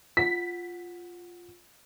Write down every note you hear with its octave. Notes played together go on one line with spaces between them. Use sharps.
F4 F#5 B6